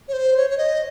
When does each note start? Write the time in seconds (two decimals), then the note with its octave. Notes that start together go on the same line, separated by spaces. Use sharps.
0.08 C#5
0.13 C5
0.37 C#5
0.50 C#5
0.58 D#5